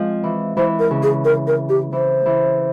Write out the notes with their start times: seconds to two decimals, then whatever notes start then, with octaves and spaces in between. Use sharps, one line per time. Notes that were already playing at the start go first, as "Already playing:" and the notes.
Already playing: F3 G#3 C4
0.24 E3
0.57 E3 C5
0.79 A#4
0.91 C#3
1.03 G#4
1.25 A#4
1.47 A#4
1.69 G4
1.93 E3 C5
2.26 E3